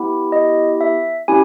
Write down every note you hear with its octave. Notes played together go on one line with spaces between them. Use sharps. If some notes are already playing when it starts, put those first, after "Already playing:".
Already playing: B3 E4 G4
D#5
E5
C#4 E4 G4 G#5